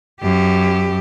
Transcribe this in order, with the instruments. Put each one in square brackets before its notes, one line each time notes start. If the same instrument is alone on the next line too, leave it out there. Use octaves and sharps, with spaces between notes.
[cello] F#2 G4